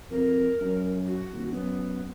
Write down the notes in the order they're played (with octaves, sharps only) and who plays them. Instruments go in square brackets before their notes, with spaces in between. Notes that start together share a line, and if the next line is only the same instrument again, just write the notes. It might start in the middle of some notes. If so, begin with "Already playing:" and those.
[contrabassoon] F2 [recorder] A#4
[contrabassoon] F#2
[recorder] F#4
[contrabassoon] D#1
[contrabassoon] F#2 [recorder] B3